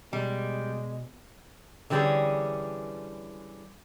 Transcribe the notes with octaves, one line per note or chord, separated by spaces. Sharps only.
B2 G3 G#3
D3 E3 G3 C4 C#4 G#4